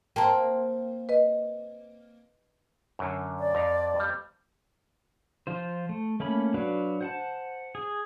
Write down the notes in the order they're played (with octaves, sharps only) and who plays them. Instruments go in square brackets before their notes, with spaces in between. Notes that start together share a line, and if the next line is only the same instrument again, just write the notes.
[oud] A#3 C4 [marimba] G5 A5 A#5
[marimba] B4 D#5
[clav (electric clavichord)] F#2 D3
[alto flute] D5
[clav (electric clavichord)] F2 A#5
F2 G3
[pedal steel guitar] F3 F4 C5
A3
A3 A#3 C#4 B5
F#3 D4 F#4 B4 F5
C5 F#5 A5
G#4